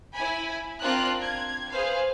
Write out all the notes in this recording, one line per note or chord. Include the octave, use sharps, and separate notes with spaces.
E4 G#5 B5
C4 D4 F4 A#4 F#6
G#6
G#4 B4 C5 F5